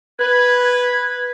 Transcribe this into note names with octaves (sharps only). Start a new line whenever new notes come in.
B4 G#6